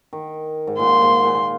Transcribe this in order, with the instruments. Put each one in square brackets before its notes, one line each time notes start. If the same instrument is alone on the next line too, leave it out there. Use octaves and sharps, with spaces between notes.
[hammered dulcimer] D#3
G#2
[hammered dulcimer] A#2 [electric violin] C6
[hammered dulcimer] G#2
A#2